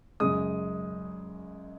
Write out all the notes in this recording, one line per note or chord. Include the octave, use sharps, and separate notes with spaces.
F#2 C#3 G#3 D#6